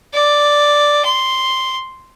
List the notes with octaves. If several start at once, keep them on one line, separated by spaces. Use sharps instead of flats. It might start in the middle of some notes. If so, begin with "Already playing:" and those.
D5
C6